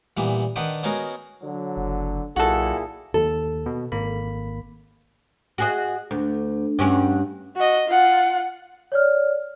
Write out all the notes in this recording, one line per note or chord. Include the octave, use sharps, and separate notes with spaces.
A#2 E3 G3 B3
D#3 D4 B4 F#5 G5 D#6
B3 C#4 D#4 F#4 G#4 A#4
D3 F#3
F#1
B1 A#2 E4 F#4 G#4 A4
D#2 A4
B2
G#1 A#3 B5
F#4 G#4 D#5
D2
G2 C#4 F#4
F#4 D#5
F4 F#5
C#5 D5 F6